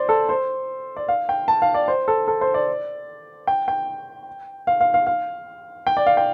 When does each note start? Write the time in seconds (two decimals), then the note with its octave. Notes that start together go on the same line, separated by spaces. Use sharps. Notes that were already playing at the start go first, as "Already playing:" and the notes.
Already playing: C5 D5
0.09 A4
0.29 C5
0.97 D5
1.08 F5
1.29 G5
1.48 A5
1.62 F5
1.74 D5
1.88 C5
2.08 A4
2.28 A4
2.41 C5
2.54 D5
3.47 G5
3.68 G5
4.67 F5
4.81 F5
4.94 F5
5.07 F5
5.87 G5
5.97 D5
6.07 F5
6.17 G5